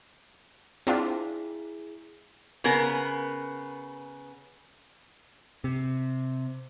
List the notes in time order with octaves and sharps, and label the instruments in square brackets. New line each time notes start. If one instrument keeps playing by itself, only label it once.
[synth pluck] C4 D4 F4 [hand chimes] E4 G#4 B6
[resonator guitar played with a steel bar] C#3 B3 A#4
[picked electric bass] C3